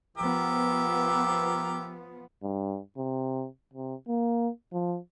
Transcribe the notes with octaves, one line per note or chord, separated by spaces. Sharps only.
F3 B3 G4 A#4 E5
G2
C3
C3
A#3
F3